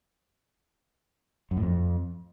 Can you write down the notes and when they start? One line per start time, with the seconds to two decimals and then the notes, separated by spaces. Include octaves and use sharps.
1.51 F#2
1.57 A2
1.63 F2